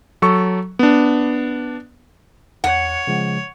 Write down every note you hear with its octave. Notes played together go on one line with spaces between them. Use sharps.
F#3 A4 C#6
B3 D4
E2 C#5 F#5
C#3 F3 G#3